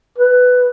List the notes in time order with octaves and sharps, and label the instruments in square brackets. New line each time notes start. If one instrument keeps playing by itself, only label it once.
[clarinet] B4